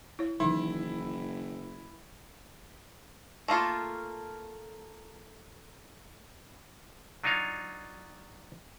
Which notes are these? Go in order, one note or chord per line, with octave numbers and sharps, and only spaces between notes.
E4 C#5
F#1 D#3 E3 F#3 D#4 E4
A3 A#3 F4 A4
F#3 D4 D#4 F4 C#5 F5